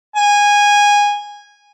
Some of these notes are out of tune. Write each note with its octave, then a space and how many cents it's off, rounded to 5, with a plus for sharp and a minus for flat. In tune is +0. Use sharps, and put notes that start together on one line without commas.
G#5 -15